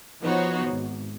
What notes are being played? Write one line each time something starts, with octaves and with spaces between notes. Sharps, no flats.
F3 B3 D#4 F#4 C5 C#5
G#1